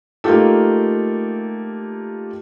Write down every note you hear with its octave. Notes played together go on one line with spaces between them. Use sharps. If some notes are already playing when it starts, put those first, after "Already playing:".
A3 A#3 D#4 F4 G4 A4